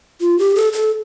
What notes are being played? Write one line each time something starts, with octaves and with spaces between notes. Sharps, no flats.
F4
G4
A4
A4